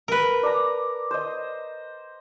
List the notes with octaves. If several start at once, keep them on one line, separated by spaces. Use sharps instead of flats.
A#4 B4
D5 A#5
C5 D#5